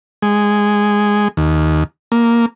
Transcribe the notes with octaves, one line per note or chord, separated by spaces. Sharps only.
G#3
D#2
A#3